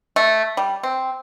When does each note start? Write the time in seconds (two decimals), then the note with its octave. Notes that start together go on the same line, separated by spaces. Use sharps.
0.16 A3
0.57 G3
0.83 C4